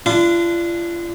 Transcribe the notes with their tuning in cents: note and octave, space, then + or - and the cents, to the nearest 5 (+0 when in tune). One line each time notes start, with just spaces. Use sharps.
D4 +5 F4 -40